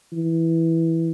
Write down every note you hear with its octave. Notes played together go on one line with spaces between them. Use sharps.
E3